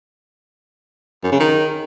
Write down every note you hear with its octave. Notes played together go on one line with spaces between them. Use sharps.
F#2
C#3
D#3